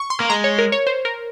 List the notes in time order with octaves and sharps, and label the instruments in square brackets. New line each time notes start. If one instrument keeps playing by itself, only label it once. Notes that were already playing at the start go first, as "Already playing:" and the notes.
Already playing: [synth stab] C#6
C6
[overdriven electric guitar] A#3
[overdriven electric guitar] G#3 [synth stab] A#5
[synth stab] C#5
A#4
C#5
C5
A#4